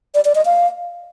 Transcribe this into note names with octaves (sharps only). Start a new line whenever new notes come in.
D5
D5
D#5
F5